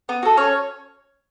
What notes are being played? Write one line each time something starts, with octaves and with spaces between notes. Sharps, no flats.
B3
F#4 A4
C#4 C#5